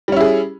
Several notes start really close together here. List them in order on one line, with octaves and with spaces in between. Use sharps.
G3 C#4 E4 G#4